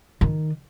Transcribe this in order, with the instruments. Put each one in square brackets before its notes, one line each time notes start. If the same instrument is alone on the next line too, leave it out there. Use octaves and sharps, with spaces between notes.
[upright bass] D#3